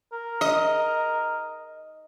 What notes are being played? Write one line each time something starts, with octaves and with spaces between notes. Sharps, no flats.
A#4
D#5